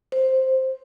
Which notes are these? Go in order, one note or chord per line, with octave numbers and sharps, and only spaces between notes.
C5